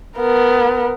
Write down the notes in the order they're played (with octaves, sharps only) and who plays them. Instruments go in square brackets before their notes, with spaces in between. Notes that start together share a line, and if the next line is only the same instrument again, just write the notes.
[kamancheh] B3 A#4